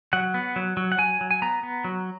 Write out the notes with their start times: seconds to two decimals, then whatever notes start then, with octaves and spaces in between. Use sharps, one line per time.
0.13 F#3 F#5
0.34 B3
0.56 F#3
0.77 F#3
0.92 F#5
0.98 F#3 G#5
1.21 F#3
1.31 G#5
1.42 B3 A#5
1.63 B3
1.84 F#3